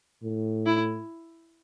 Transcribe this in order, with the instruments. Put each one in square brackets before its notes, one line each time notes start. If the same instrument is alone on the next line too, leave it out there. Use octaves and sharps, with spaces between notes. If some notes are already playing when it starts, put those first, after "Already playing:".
[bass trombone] A2
[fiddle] E4